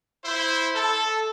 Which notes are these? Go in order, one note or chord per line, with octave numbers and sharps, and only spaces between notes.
E4 C5
A4